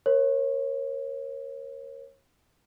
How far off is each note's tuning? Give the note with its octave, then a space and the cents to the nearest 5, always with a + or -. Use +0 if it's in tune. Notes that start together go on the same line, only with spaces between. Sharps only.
A#4 +15 C#5 -30